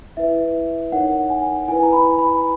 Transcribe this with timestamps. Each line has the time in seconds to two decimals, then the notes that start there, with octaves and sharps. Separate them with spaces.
0.17 E4 B4 E5
0.92 D#4 A#4 C#5 F#5
1.30 G#5
1.68 E4 B4 G#5
1.83 A#5
1.93 B5
2.19 B5